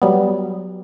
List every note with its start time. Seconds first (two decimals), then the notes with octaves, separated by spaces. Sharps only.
0.02 F#3 G3 B3